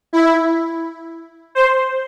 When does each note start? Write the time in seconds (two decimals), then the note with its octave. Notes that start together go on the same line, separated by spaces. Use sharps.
0.13 E4
1.55 C5